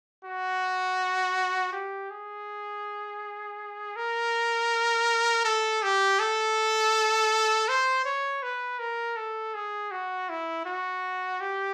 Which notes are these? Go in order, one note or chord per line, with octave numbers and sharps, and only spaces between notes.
F#4
G4
G#4
A#4
A4
G4
A4
C5
C#5
B4
A#4
A4
G#4
F#4
E4
F#4
G4